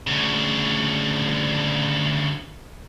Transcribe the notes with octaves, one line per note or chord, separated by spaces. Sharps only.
D2 C#3